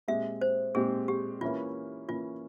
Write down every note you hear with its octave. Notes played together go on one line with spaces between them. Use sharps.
A#2 G#3 C4 G4 E5
C5
A#2 G#3 C4 G4 G#4
G4
E3 A#3 C#4 E4 F4
E3 A#3 C#4 E4 F4